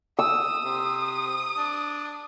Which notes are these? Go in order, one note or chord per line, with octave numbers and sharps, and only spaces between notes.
D#6 E6
C3
D4